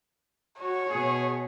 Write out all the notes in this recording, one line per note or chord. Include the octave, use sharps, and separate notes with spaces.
F#4 C#5
B2 G#4